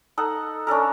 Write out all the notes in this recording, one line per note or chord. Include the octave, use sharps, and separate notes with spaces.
D#4 A4 D#5 F#5
C#4 D4 A4 A#4